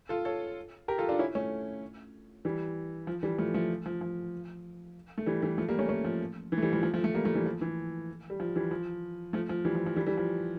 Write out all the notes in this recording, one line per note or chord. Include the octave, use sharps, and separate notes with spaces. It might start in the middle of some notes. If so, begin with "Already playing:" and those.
F4 A4
A4 C#5
G4 A#4
F4 A4
D4 F4
C#4 E4
A3 C#4
E3 G3
F3
E3 G3
F3 A3
F3 A3
F3
F3
A3
E3 G3
E3 G3
F3 A3
G3 A#3
A3 C#4
A3 C#4
F3
E3
A3
E3 G3
F3 A3
F3 A3
F3 A3
F3 A3
G3 A#3
F3 A3
E3 G3
F3
E3
G3
F3
E3 G3
F3
F3 A3
F3
E3 G3
F3
F3
E3 G3
E3 G3
F3